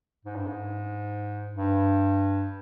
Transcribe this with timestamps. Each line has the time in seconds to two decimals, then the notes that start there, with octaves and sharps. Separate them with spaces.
0.25 G#2
0.36 G2
0.47 G#2
1.53 G2